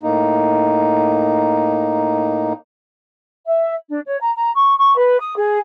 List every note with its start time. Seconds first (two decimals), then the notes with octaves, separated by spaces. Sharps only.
0.03 A2 A#3 D#4
3.47 E5
3.89 D4
4.07 C#5
4.20 A#5
4.36 A#5
4.54 C#6
4.79 C#6
4.96 B4
5.20 D#6
5.37 G#4